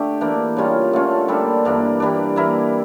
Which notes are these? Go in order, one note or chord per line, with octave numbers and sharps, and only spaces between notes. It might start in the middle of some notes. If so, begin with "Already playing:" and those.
Already playing: D3 A3 G4
E3 A#3 D4
C#3 G3 C#4 F4
D3 A3 C#4 F4
G3 A#3 D4 A4
G2 E3 A#3 D4
E3 G3 D4
E3 A#3 E4 A#4